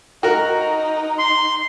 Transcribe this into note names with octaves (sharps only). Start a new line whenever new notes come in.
D#4 F#4 A#4
C6